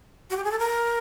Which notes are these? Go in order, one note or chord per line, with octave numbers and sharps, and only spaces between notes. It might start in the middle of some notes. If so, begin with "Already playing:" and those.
F#4
G4
G#4
A4
A#4